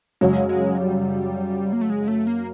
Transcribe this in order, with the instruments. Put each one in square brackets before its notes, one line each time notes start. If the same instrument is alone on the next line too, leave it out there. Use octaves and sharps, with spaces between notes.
[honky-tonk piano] F#2 C#3 F#3 [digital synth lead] G#3
[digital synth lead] G#3
G3
A#3
A3
G#3
A3
A#3